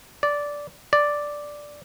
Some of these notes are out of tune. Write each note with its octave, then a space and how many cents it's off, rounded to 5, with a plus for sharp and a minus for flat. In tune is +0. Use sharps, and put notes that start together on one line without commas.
D5 -10
D5 +0